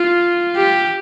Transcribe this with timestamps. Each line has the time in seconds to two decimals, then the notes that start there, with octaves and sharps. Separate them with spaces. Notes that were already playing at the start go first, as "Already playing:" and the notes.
Already playing: F4
0.56 G4